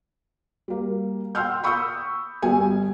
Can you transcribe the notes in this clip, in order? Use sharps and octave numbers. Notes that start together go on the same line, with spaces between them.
G3 A#3
F#5 G5 C6 E6 F6 G6
B5 C#6 D#6 E6 G6
G1 G3 B3 G#5